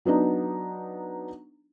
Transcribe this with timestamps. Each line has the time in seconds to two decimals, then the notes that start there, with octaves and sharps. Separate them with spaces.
0.05 F#3 B3 D4 D#4